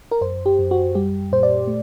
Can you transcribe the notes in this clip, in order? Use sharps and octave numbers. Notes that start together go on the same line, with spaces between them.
A#4
F#2 C5
G4
F#2
F#4
G3 G4
A#2 C5
D5
A3